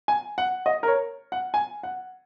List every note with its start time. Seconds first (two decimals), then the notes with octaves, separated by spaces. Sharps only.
0.08 G#5
0.38 F#5
0.66 D#5
0.83 A#4
0.88 C#5
1.32 F#5
1.54 G#5
1.83 F#5